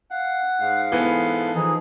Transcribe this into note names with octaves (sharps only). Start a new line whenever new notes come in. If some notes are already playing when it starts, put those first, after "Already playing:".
F5 F#5
G#2 G#3 F5
E3 B3 A4
E3 F3 D#4 G#4